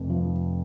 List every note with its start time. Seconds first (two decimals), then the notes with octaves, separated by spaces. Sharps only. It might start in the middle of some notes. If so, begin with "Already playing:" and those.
Already playing: F1 F2
0.10 F3